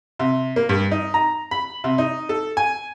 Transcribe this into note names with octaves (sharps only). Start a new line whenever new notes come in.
C3
A#3
G2
D#4
A#5
B5
C3
D#4
A4
G#5